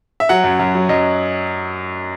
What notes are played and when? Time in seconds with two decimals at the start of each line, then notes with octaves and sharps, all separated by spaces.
0.20 E5
0.29 F#3 F#5
0.44 F#2
0.59 F#2
0.75 F#3
0.89 F#2 D#5